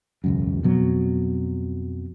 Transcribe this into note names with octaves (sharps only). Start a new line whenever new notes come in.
E1 C#2 F#2
F2 B2 F#3